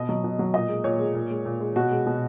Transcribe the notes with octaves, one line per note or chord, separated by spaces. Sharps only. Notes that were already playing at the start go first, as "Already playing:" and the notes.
Already playing: B2 D#5
F#3
B2
F#3
A#2 D#5
G#3
A#2 C#5
G#3
A#2
G#3
A#2
G#3
B2 F#4
G#3
B2